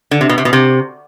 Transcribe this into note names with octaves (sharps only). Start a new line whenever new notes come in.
D3
C3
B2
C3
B2
C3